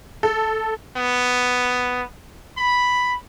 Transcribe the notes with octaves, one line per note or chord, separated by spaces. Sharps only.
A4
B3
B5